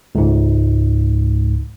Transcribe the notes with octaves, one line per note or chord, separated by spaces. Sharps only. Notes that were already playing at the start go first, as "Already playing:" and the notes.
C#2 G#2